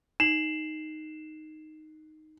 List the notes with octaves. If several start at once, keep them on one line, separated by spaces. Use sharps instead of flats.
D#4 C7 E7 F#7